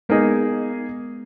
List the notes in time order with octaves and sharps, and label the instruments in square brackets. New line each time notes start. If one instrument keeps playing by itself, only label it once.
[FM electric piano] G#3 B3 [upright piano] A#3 D#4 G#4 D#5